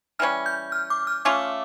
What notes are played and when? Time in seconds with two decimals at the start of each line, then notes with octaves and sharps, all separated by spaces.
0.19 E3 G3 C#4 F6
0.46 G6
0.72 F6
0.90 D6
1.07 F6
1.25 A3 C#4 F4 D6